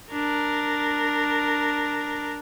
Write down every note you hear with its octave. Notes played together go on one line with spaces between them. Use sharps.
D4 A#4